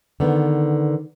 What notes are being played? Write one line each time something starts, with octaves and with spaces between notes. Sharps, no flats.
D3 D#3 B3